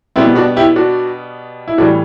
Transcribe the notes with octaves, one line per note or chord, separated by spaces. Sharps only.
B2 G3 B3 C4 E4
D4 F#4
E4 G4
D4 F#4
E4
A2 E3 G3 D4 F#4